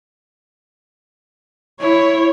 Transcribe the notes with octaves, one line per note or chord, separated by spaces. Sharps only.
E4 C#5